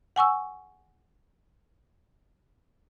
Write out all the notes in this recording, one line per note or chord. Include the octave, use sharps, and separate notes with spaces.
F#5 G#5 C#6 E6